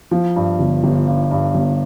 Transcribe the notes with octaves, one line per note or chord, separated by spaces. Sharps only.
F3
G2
G1
G1
G2
G2
G1